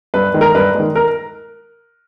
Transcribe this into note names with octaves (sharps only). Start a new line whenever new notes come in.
G2 B4
D#3 G#3
A#4
G2 B4
G#3
D#3
A#4